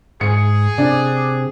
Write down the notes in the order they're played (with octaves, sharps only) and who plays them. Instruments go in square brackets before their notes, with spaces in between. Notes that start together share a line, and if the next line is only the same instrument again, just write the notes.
[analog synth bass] G#2 [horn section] G#4 [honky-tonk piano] C#7
[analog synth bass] C3 [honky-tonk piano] D4